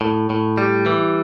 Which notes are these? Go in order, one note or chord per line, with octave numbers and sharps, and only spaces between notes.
A2
A2
G3
E3